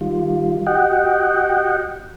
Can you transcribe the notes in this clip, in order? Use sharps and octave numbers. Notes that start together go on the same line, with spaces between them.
D#3 G3 F4
F#4 G4 D#5 F#5 G5